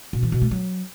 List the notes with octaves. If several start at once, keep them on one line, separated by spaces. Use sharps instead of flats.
B2
E3
B2
A3
F#3